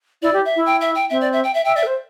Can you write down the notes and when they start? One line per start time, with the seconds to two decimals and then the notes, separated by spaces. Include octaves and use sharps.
0.22 E4 D5
0.33 G4
0.45 E5
0.56 E4
0.66 G5
0.81 E5
0.95 G5
1.10 C4 E5
1.21 D5
1.33 E5
1.44 G5
1.54 E5
1.65 E5 G5
1.76 D5 E5
1.83 A4
1.87 C5